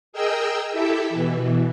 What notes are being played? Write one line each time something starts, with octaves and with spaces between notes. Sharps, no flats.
G#4 A#4 D#5 G5 E6
E4 G4 A4 E5
B2 E3